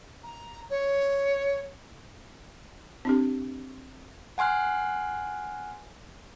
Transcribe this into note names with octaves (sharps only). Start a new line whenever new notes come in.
A#5
C#5
C4 D4 G4
F#5 G#5 C6 F6 F#6